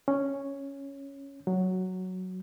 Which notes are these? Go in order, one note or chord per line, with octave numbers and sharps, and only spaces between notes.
C#4
F#3